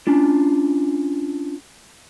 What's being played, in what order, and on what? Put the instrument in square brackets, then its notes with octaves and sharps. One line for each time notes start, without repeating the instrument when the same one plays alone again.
[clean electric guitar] C#4 D4 F4